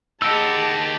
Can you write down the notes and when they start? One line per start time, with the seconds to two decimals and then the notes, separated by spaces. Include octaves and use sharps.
0.22 D#4 G4 G#4 D#5 F#5 A5 E6